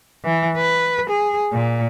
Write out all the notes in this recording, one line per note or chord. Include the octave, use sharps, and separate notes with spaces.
E3
B4
G#4
A#2